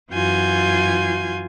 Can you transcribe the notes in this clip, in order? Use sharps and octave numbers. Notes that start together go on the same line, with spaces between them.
F#2 E3 F4 F#4 G#5 G6